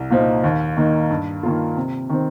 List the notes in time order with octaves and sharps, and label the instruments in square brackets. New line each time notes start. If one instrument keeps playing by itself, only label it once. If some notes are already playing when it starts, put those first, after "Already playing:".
Already playing: [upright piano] C2
A#2 F3 D#4
D#2
D#3 A#3 D#4
G2
D#3 A#3 F4
C3
D#3 C4